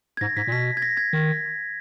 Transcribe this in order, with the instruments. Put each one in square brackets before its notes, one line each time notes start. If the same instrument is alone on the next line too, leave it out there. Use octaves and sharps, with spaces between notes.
[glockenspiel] G#6
[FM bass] G#2 [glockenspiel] A#6
[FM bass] G#2 [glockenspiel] B6
[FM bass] A#2
[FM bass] B2 [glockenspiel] B6
[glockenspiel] G#6
A#6
G#6
[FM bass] D#3